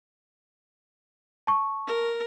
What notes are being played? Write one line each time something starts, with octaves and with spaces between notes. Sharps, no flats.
A5 C#6
A#4